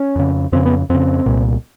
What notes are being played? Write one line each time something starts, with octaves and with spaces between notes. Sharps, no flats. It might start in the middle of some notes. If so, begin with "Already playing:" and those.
Already playing: C#4
F2 C#3
F2 C#3 C4
B3
F2 C#3 C4
C2 A#2